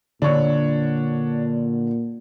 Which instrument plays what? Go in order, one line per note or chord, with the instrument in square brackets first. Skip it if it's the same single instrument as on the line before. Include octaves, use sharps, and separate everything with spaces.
[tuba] A#2 [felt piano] D3 [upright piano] D4 C#5